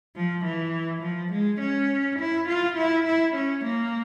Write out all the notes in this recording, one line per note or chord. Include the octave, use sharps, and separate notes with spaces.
F3
E3
F3
G#3
C#4
E4
F4
E4
E4
C#4
A#3